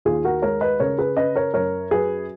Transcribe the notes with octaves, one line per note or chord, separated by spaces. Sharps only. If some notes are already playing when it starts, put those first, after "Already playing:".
D#2 F4 G#4
F#4 A#4
G#3 A#4 C#5
B4 D#5
C#3 A#4 C#5
G#4 B4
C#4 B4 D#5
A#4 C#5
F#2 A#4 C#5
F#3 G#4 B4